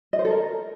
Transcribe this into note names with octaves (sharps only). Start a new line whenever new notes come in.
D#5
C5
A4
A#4